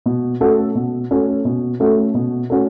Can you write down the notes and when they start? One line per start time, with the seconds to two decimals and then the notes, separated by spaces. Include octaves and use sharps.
0.06 B2
0.40 A3 C#4 F#4 A4
0.75 B2
1.11 A3 C#4 F#4 A4
1.45 B2
1.80 A3 C#4 F#4 A4
2.15 B2
2.50 A3 C#4 F#4 A4